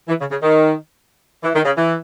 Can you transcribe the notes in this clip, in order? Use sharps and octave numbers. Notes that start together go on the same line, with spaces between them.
E3
C#3
C#3
D#3
E3
D#3
C#3
E3